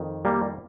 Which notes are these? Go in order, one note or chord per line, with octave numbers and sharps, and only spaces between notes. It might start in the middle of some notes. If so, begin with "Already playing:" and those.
Already playing: F2 D#3
G3 A#3